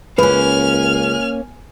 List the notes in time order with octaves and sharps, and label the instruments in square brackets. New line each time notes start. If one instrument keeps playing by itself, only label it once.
[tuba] C#2 [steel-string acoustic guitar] A#3 C#4 [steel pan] B4 [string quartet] G#5 F6